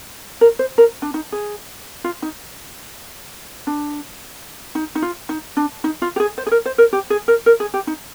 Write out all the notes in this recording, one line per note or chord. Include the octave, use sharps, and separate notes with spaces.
A#4
C5
A#4
D4
D#4
G#4
F4
D#4
D4
D#4
D#4
F4
D#4
D4
D#4
F4
G4
G#4
C5
G#4
A#4
C5
A#4
G4
G#4
A#4
A#4
G#4
G4
D#4